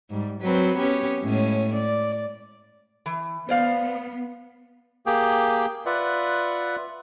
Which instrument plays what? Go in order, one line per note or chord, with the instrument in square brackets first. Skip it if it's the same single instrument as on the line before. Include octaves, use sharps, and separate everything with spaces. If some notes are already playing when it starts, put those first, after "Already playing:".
[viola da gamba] G#2 G3
F#3 C4 B4
B3 C#4 G4
A2 G#3 C#4
D5
[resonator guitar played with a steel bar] E3
[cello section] B3 [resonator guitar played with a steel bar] C5 D5 F5
[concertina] A#3 G4 G#4 G5
F4 B4 D5 E5 F#5